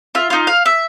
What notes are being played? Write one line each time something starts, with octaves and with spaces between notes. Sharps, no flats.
F4 E5
D#4 F4
F5
E5